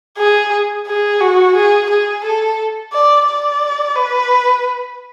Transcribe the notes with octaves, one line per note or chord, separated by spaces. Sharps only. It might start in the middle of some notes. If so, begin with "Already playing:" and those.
G#4
G#4
F#4
G#4
G#4
A4
D5
D5
B4